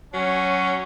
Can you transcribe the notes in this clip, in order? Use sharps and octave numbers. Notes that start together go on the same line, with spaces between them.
F#3 C#4